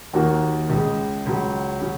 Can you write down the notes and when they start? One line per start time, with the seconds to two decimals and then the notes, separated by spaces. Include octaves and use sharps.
0.13 D#2 D#3 A#3 F#4
0.70 C#2 C#3 G#3
1.26 C#2 C#3 F#3
1.81 C#3 F#3